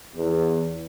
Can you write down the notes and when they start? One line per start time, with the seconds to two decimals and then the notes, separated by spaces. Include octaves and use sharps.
0.15 E2